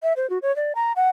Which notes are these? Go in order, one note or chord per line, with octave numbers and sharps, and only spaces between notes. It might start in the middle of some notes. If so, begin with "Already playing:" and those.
E5
C5
F#4
C#5
D5
A#5
F#5